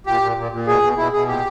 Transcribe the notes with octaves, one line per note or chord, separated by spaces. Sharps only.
A#2 G4
A#2
A#2
A#2
B2 G#4
B2
B2 E4
B2 G#4
A#2 G4